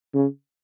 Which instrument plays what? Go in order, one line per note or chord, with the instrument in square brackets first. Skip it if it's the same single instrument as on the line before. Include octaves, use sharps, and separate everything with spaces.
[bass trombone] C#3